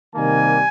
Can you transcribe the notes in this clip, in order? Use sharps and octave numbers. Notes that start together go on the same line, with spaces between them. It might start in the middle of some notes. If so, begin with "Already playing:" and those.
C3 D#3 G3 A#3 G#5